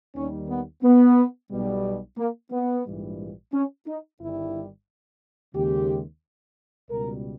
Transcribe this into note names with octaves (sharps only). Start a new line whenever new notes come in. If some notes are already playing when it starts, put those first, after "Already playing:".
D#2 D#3 G3 C#4
B3
B3
B1 B2 G3
A#3
B3
A#1 G#2 E3 G3
C#4
D#4
G1 G2 D#3 G3 E4
D#2 C#3 G#3 G4
C#2 B2 G3 A#4